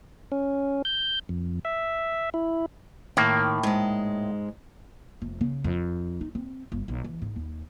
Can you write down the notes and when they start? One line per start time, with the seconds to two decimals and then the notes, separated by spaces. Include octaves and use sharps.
0.32 C#4
0.85 G6
1.29 F2
1.65 E5
2.34 E4
3.17 A2 D#3 A#3
3.63 G#2 G#3
5.22 F1
5.41 C#3
5.64 F2
6.21 D#4
6.35 C4
6.72 G1
6.88 B1
7.04 E3
7.22 G#2
7.36 D#2